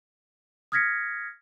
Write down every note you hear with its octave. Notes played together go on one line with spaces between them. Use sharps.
D#6 F6 G#6 A#6 B6 C#7